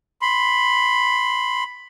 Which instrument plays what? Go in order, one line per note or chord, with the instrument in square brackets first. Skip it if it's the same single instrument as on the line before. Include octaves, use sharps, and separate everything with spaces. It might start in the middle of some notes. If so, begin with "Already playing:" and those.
[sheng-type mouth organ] B5 C6